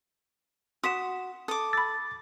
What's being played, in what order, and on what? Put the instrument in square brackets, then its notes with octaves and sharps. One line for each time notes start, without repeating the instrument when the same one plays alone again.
[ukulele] F#4 F#5 [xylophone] C6 B6 E7 [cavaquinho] D#6
[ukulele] A4 [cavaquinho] D6 D#6
[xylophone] B5 E6 [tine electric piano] A6